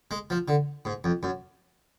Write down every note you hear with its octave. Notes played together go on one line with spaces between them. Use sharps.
G#3
F3
D3
G#2
F2
F#2